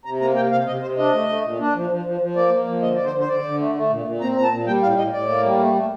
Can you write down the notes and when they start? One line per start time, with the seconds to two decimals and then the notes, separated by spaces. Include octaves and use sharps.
0.05 C3 A#5
0.21 A#3 A#5
0.36 C3 G5
0.51 C3 F5
0.67 C3 D#5
0.82 C3 C5
0.97 D4 D#5
1.13 A3
1.29 A3
1.44 A#2
1.59 D4
1.75 F3
1.90 F3
2.05 F3
2.21 F3
2.36 A#3 D5
2.52 A#3
2.67 F3
2.82 D3 D#5
2.95 D3 D5
3.05 C5
3.13 D3
3.19 C5
3.28 D3 D5
3.44 D3
3.59 A3
3.75 A3
3.90 A#2
4.05 A#2
4.21 C4 A#5
4.36 A#2 A#5
4.43 A5
4.51 A#2
4.67 G3 G5
4.82 A2 F5
4.98 A2 D#5
5.13 A2 D5
5.28 A#3
5.44 G3
5.59 A3
5.74 A3